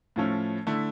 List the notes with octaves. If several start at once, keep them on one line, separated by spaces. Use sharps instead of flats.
A2 F3 A3 C#4
D3 A3 E4